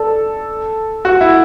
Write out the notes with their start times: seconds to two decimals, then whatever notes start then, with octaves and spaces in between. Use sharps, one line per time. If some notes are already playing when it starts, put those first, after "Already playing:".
Already playing: A4 D5
1.05 F#4
1.21 E4